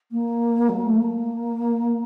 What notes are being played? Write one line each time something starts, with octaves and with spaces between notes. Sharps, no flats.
A#3
F#3
A3
A#3